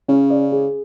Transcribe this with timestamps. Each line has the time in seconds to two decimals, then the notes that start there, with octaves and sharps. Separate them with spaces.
0.08 C#3 C#4
0.30 D5
0.52 G#4